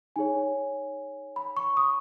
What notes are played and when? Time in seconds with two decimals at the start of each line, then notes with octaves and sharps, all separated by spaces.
0.16 D#4 G#4 C#5 G#5
1.36 B5
1.57 C#6
1.77 D#6